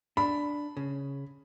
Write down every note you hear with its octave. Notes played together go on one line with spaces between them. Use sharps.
D4 B5
C#3